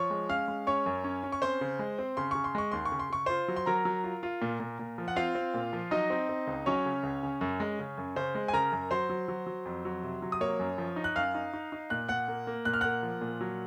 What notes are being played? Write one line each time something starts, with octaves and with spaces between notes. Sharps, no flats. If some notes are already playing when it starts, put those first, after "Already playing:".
Already playing: F3 C#5 C#6
G#3
C#4 F5 F6
G#3
C#4 C#5 C#6
F#2
C#4
C#4
C#6
C4 C5 C6
C#3
G#3
C4
C#3 C6
C#3 C#6
C6
G#3 C#6
D#2 C6
C#6
C#3
C6
C#3 C#6
F4 C5 C6
F#3
C6
F#3 A#4 A#5
F#3
F4
F4
A#2
A#2
A#2
F3
F#5
C4 F4 F5
C4
A#2
F3
F#3 D#4 D#5
C4
C4
C#2
F#3 C#4 C#5
C#3
C#2
C#3
F#2
G#3
C#3
F#2
C#3 C5
G#3
G#5
C#3 A#4 A#5
F#2
F#3 C5 C6
F#3
F#3
F#3
F2
F#3
C3
F#3
D#6
A#3 C#5 C#6
F#2
F3
D#4
F#6
F#2 F5 F6
D#4
D#4
D#4
A#2 F#6
A#2 F#5 F#6
A#3
A#3
A#2 F#6
F6
A#3 F#5 F#6
F3
A#2
F#3